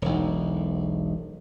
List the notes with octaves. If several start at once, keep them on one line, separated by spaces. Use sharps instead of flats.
E1 B1